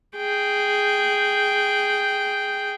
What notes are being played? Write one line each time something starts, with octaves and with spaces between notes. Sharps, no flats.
G#4 G5